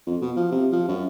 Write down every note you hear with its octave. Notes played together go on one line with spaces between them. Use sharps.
F2
B2
F3
C3
F3
F#2